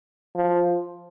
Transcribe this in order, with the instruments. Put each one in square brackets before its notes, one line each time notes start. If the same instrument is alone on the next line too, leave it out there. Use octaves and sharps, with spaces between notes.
[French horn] F3